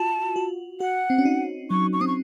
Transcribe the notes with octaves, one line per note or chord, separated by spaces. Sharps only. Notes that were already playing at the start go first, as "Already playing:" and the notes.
Already playing: F4 F#4 A5
F#4
F#4 F#5
C4
C#4
D#4
F#3 C#6
C#6
C4 D#6
C#6